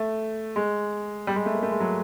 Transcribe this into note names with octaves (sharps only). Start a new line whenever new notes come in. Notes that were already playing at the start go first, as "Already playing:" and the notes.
Already playing: A3
G#3
G3
G#3
A3
A#3
A3
G#3
F#3